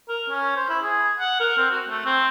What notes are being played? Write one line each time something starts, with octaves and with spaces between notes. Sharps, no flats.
A#4
C#4
C5
E4
G#4
F#5
A#4
C4
F#4
A3
C4